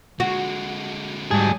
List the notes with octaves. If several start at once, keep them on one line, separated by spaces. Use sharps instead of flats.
D3 G#3 F#4
G#2 F#3 G3 G#4 A5